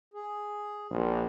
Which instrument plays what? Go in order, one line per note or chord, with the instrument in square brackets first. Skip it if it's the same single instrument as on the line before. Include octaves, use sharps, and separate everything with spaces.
[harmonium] G#4
[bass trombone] A#1